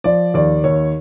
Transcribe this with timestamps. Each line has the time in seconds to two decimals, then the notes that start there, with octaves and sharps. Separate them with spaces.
0.04 F3 D5
0.34 D#2 D5
0.64 D#2 C#5